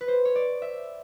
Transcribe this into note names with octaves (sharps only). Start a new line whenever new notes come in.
B4
C5
C#5
D5
E5